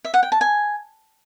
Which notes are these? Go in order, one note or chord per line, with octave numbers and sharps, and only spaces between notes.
E5
F#5
G5
A5
G#5